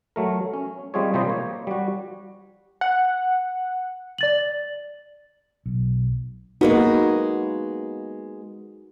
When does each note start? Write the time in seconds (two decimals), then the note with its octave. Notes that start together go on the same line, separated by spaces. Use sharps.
0.16 F#3 A3 A#4
0.54 C#4
0.94 G3 G#3 C4 F4 G#4 C#5
1.14 C3 F3 G3 E4 C5 D#5
1.26 A#3 C#5
1.67 G3 F#4
2.81 F#5
4.18 D5 A6 F#7
5.66 B1
6.61 G#3 A#3 B3 D#4 F#4